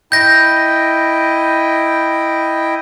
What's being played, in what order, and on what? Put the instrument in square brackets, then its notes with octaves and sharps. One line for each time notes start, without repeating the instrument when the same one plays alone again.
[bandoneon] E4 D#5 G5 [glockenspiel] G6 A#6